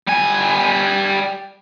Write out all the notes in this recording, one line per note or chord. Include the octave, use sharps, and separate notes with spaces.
G3 G#5